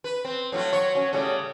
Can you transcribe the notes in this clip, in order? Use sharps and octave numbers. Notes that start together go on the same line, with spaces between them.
B4
C4
A2 F#3 F4
F#3 C#5
F#3 C#4
A2 C#3 G3